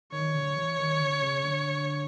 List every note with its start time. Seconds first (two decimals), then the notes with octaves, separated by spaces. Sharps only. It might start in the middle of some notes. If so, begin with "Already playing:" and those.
0.12 D#3 C#5
0.34 D3
0.56 E3
0.78 D#3
1.00 D3
1.22 C#3
1.43 D3